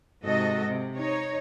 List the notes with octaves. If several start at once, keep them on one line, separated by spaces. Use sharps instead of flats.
G#2 C3 F#4 A4 D#5
C3
D#4 C#5